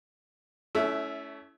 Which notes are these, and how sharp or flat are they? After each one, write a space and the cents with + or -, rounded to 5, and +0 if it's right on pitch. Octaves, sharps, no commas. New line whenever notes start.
A3 -20 C#4 +20 E4 +0